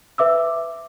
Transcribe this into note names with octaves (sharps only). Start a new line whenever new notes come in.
B4 E5 D6 E6